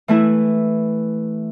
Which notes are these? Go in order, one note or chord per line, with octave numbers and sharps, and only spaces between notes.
E3 A3 E4